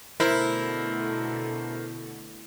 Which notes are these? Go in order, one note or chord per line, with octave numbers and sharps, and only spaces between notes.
B2 D3 A3 E4 A#4 C5